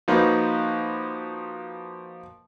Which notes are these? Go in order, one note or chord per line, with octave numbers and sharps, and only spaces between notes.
F3 A#3 D#4 F#4 B4 C5